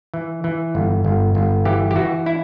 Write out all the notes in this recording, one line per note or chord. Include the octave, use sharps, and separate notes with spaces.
E3
E3
G1
G1
G1
E3 G4
G4
E3 F#4
E4